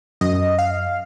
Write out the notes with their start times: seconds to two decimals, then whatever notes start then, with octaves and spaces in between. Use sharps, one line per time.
0.21 F#2 D#5
0.58 F5